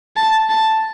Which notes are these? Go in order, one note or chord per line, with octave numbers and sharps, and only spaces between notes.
A5
A5